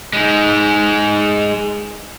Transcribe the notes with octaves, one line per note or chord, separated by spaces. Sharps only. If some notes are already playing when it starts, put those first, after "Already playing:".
G#3 D#4